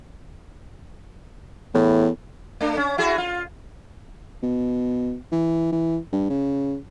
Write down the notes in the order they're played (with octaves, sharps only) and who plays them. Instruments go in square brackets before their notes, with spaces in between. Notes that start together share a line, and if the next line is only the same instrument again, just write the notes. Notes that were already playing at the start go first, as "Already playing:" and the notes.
[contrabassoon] E2 [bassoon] A2
[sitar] A3 D4
C#4
E4 F#4 G#4
F4
[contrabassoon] B2
E3
E3
G2
C#3